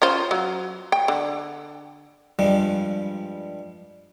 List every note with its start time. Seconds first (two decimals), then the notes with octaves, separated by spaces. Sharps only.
0.02 C#4 F4 C5
0.31 F#3
0.92 G5
1.08 D3
2.39 G2 F3 G3 G#3